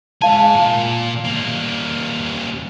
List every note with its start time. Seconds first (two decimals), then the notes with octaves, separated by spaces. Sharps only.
0.22 G#2 F5 G#5 A5
0.56 A#2
1.24 G3 A#3